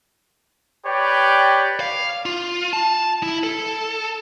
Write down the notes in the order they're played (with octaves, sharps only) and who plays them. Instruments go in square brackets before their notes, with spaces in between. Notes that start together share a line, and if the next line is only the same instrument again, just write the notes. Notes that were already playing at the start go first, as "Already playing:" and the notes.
[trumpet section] G4 B4 C#5 D5 G5
[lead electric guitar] F5
F4
A5
E4
A4